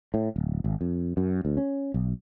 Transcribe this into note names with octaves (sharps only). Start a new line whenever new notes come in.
A2
D1
G#1
F2
F#2
D2
C#4
B1